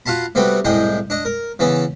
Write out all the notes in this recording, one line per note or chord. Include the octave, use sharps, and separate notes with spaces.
F4 F#4 F5 A5 B5
C3 G3 A3 B3 F#4 G4
C2 A2 G#3 D#5 G5
D4 D#5
A#4
C#3 E3 B3 C#4